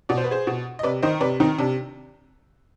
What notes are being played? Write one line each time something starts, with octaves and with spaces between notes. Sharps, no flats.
B2 D5
C5
B4
G#4 C5
B2
D#5
C3 B4 D5
D#3 C5 D#5
C3 B4 D5
D#3 C4 D#4
C3 D4